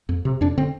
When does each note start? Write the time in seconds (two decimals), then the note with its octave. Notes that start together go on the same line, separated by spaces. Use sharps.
0.09 F2
0.25 C3
0.41 F2 D4
0.58 D3 C4